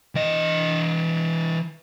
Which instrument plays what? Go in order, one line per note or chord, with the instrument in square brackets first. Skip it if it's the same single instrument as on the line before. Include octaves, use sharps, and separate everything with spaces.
[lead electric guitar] E3 D#5